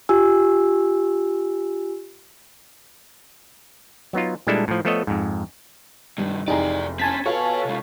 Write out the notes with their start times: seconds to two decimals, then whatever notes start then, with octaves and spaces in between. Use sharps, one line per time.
0.09 F4 G4 G#5 E6
4.13 F#3 B3 D#4 F4
4.47 A#2 G3 G#3 D4 E4 A4
4.68 A2 F3
4.85 F3 A3 B3 A4 C#5 D#5
5.07 F2 G#2
6.18 C2 G2 D#3
6.48 F1 E3 C4 D#4 G4 G#4 D5 A#5
6.99 C4 C#4 G#5 A5 B6
7.26 F4 F#4 A4 B4 C#5
7.65 C3 G#3